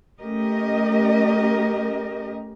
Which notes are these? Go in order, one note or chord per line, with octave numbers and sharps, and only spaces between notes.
A3 C#4 G4 A#4 D#5